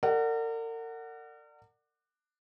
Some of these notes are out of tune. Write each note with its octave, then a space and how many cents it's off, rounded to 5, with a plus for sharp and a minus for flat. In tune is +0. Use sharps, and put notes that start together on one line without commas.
A#4 -40 D5 +20 F#5 +0